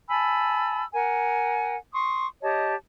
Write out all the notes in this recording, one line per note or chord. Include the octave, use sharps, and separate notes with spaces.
G#5 A5 B5 E6
A#4 F#5 G#5
C6 C#6 D#6
G4 C#5 D#5 A5